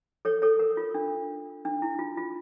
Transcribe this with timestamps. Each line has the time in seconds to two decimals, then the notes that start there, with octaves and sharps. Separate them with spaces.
0.25 A4 C#5
0.42 A4 C#5
0.59 A#4
0.77 F4
0.94 D4
1.65 D4
1.82 E4
1.99 F4
2.17 F4